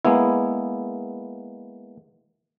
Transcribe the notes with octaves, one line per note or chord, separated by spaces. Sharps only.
G#3 A#3 B3 E4